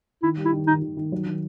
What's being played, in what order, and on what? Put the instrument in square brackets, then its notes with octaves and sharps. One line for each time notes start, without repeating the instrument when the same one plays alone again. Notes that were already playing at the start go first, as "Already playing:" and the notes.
[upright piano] D#3 [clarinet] E4
[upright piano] G3
[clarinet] E4
[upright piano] D#3
[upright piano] D#3 [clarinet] D#4
[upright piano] D#3
D#3
F#3
D#3